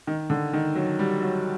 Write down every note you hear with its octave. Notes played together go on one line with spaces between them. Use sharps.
D#3
D3
D#3
F#3
G3
F#3